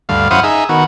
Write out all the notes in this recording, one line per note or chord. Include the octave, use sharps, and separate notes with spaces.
D2 G2 F5
F#2 E4 C5 F5 F#5 D#6
D#4 G#4 E5
D#3 B3 F#4